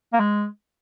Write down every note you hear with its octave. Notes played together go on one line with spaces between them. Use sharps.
A#3
G#3